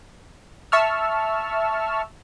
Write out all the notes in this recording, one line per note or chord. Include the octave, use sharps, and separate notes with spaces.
E5 A5 C#6 E6 F6